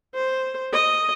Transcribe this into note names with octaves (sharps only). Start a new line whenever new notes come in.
C5
D#5